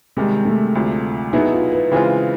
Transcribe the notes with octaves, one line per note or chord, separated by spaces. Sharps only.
C3 D#3 G3 G#3
A3
D2 C3 F3
B2 F#3 B3 D#4 E4 G#4
F4
B4
C#3 E3 G#3 C4 F4 B4